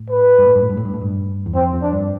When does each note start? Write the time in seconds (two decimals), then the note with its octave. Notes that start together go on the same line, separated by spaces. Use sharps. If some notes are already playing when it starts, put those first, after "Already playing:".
Already playing: A2
0.10 B4
0.39 G2
0.46 A2
0.55 G2
0.63 A2
0.70 G2
0.77 A2
0.85 G2
0.94 A2
1.01 G2
1.46 E2
1.54 F2 C4
1.73 F2
1.82 D4
1.92 G2